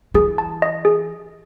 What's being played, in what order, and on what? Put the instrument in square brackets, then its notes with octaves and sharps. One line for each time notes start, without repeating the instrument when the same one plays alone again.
[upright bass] E3 [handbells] G#4
[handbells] A5
D#5
G#4